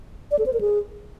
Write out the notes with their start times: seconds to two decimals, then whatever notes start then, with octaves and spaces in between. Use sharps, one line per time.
0.31 D5
0.39 A4
0.46 C5
0.53 A#4
0.61 G#4